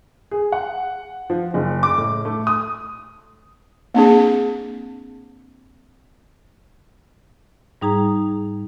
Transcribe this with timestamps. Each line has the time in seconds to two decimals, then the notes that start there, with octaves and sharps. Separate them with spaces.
0.31 G#4
0.52 F#5
1.30 F3
1.54 F#1
1.83 D6
1.98 A2
2.25 A3
2.47 D#6
3.94 A#3 C4 D4 G#4
7.81 G#2 G3 D#4 G#4 A#5